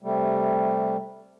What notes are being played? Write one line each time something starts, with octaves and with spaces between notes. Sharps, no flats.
C3 G3 A3